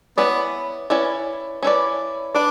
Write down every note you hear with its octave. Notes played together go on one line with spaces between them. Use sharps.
B3 C#4 E4 B4 D5
C#4 E4 B4 D5
C#4 E4 B4 D5
D4 B4 D5